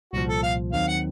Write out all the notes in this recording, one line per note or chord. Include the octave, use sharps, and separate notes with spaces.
C2 A#2 F3 F#4
A4
F5
D#2 D#3 F#3 C4 D#4 F5
F#5